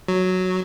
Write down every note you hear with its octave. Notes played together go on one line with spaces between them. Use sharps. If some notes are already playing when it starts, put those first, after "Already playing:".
F#3